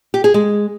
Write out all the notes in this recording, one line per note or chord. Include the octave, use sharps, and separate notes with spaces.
G4
G#4
G#3